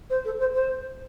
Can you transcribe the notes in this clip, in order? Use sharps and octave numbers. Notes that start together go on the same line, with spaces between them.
C5
A4
C5
C5